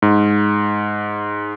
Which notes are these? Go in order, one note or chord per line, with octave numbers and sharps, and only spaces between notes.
G#2